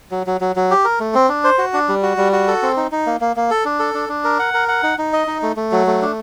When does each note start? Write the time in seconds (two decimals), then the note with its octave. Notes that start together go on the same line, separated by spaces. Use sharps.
0.11 F#3
0.27 F#3
0.41 F#3
0.56 F#3
0.71 G4
0.85 A#4
1.00 A3
1.15 C4
1.29 D4
1.44 C5
1.58 F#4
1.74 D4
1.89 G3
2.03 F#4
2.17 G3
2.33 F#4
2.48 A4
2.63 C4
2.77 D#4
2.92 D#4
3.06 A#3
3.21 A#3
3.36 A#3
3.51 A4
3.65 D4
3.80 A4
3.94 D4
4.09 D4
4.24 A#4
4.39 F#5
4.54 A#4
4.68 F#5
4.83 D#4
4.98 D#4
5.13 D#5
5.27 D#4
5.42 A3
5.56 A3
5.72 F#3
5.87 A3
6.02 D4